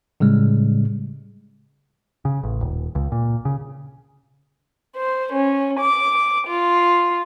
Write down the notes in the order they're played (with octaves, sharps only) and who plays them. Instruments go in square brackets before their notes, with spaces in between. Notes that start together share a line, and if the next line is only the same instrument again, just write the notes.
[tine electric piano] A2 C#3 G3 G#3
[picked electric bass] C#3
A1
D#1
C#2
A#2
C#3
[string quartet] C5
C#4
D6
F4